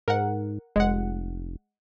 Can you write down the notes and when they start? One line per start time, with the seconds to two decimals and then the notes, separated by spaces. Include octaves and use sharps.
0.08 G#2 A#4 F#5
0.76 F1 G#3 F#5